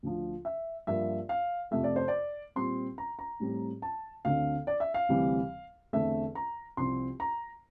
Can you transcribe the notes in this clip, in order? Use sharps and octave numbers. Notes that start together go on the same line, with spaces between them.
D2 D3 F3
E5
G2 F3 A#3 E5
F5
F2 C3 F3 A3 E5
D5
C5
D5
A#2 G3 C4 C6
A#5
A#5
A2 G3 C4
A5
D2 D3 A3 C4 F5
D5
E5
F5
D2 C3 E3 G3 C4
E2 D3 A3 C4 E5
A#5
C2 C3 F3 C4 C6
A#5